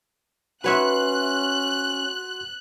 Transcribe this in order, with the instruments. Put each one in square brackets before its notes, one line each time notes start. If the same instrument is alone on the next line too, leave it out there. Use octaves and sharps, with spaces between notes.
[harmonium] C#4 [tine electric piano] F#4 F#5 C6 [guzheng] B4 C#5 E5 [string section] F#6